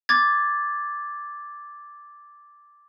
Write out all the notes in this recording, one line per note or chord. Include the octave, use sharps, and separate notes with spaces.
D6 G#6 A6